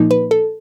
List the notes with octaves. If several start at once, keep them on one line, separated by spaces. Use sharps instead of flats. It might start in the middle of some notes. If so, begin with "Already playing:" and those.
Already playing: A#2 F3 A#3 D#4
B4
A4